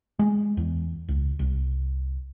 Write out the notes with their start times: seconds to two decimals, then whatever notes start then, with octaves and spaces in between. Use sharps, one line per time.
0.19 G#3
0.57 E2
1.08 C#2
1.39 C2